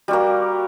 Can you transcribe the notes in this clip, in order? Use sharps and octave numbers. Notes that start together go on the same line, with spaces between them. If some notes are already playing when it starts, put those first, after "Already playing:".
G3 A#3 F#4